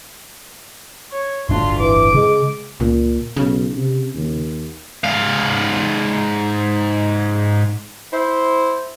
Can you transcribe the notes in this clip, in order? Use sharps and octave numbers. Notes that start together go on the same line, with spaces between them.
C#5
D1 G1 D2 D4 F4 C6
E3 D6
C#3 G#3
C#2 A#2
B1 C#3
C3
D#2
G#2 F5
E4 C5